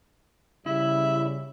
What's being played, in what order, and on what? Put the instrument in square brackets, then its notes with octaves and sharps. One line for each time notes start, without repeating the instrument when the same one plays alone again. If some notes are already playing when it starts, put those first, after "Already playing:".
[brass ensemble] C#3 G3 [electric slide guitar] E4 [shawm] E5